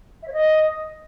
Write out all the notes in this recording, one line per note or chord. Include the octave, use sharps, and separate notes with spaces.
E5
C#5
D#5